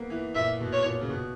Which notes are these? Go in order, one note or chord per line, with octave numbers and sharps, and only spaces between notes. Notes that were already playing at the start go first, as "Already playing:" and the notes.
Already playing: A#3 B3
E3
A#2 E5
B2
C#5
A#2
C#3
B2